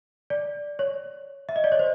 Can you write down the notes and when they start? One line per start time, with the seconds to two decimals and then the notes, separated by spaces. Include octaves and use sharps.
0.30 D5
0.79 C#5
1.49 E5
1.56 D#5
1.64 D5
1.72 C#5
1.79 C5